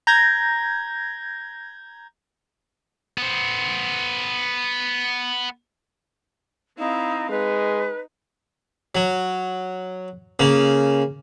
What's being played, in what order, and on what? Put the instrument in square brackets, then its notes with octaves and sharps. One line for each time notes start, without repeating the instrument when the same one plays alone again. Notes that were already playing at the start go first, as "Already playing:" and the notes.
[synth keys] A#5 G6 G#6 A#6
[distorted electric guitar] B3 C5
[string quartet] C4 E4 F5 [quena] D#4
[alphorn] G#3 [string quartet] D#4 [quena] B4
[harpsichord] F#3
C#3 A#3